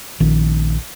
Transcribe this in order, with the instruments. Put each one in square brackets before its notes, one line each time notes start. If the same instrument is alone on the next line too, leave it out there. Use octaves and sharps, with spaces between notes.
[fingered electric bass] A#1 D#3